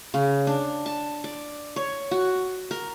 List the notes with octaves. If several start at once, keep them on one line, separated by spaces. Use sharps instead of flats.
C#3
D4
A5
D5
C#5
F#4
A#4